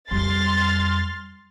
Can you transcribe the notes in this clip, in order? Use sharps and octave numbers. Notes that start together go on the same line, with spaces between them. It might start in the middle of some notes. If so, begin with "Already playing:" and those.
F2 G3 C6 F6 A6